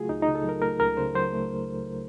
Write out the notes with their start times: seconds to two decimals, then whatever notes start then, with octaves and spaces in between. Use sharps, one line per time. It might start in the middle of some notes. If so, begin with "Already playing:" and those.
Already playing: C#3 F#3 A3 F4 F#4 G#4
0.09 C#2 D#4
0.22 D#4
0.28 C#3
0.35 A4
0.44 F#3 A#4
0.62 A3 A#4
0.80 C#2 A#4
0.97 C#3 C5
1.14 F#3 C5
1.33 A3